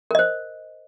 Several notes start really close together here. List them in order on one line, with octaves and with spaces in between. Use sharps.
A#4 D#5 C5